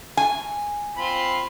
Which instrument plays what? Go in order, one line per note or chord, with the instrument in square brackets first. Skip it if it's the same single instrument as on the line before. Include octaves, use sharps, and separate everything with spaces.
[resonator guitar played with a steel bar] G#5
[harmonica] C4 F4 B5